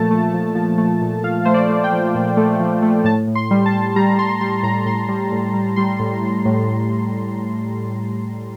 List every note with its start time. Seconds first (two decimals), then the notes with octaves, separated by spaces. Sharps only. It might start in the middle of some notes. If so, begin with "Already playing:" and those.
Already playing: A#2 F3 A3 A5
0.11 A3
0.34 F3
0.55 F3
0.78 A3
1.01 A#2
1.23 F3 F5
1.45 A3 C5
1.54 D5
1.69 A3
1.84 G5
1.92 F3
2.15 A#2
2.37 A3
2.60 F3
2.82 A3
3.04 A2 A5
3.27 A2
3.35 C6
3.51 G3
3.66 A5
3.72 G3
3.96 G3 A#5
4.19 G3 C6
4.41 G3 C6
4.63 A2 A#5
4.86 A2 C6
5.09 G3
5.32 A2
5.54 G3
5.76 G3 C6
5.99 A2
6.21 A2
6.45 A2